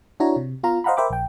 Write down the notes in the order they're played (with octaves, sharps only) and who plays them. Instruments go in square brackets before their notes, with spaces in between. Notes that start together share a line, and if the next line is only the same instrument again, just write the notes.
[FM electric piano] D4 E4 F#4 C#5 A#5
C3
B3 F4 F5 A#5
C5 D#5 F5 F#5 A#5 B5
A#4 C5 E5 G5 B5 D6
A#1 G5